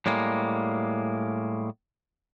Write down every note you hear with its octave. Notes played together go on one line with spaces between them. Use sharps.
A2 G3 G#3 A#3